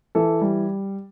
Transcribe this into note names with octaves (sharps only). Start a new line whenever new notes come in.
E3 A4
G3